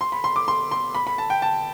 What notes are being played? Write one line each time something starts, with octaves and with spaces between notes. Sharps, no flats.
C6
B5
C6
D6
C6
C6
B5
B5
A5
G5
A5